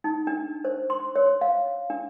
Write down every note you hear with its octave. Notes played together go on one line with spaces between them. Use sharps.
D#4
D4
C5
C6
C#5
F5
D4